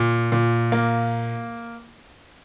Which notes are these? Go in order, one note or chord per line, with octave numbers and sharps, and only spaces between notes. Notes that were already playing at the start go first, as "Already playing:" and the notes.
Already playing: A#2
A#2
A#3